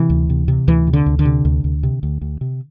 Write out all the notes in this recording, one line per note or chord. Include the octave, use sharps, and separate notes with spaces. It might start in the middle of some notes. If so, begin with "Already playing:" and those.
Already playing: C3 E3
D2
C3
C3
D2 E3
C3
D3
D2
D3
C3
D2
D2
C3
D2
D2
C3